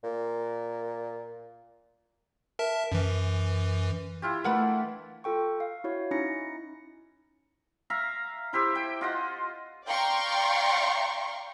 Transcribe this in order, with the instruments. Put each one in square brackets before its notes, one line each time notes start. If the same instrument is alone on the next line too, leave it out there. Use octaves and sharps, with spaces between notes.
[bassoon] A#2
[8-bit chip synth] A#4 E5 A5
F#2 E3
[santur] E4 F4 G4
[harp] E3 A3 D4 [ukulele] A#4 F#5 B5
[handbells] F4 A4 G5 C#6
F5
E4 F#4 C#5
C#4 D#4 E4 A#6 C#7
[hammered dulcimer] E5 F5 A#5
E4 G4 C5 E5
G5
F4 D#5 F#5
[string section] D5 F5 G5 A#5 C6 C#6